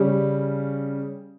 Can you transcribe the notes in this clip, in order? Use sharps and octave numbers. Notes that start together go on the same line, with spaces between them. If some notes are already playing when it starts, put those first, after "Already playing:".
Already playing: C#3 G3 C#4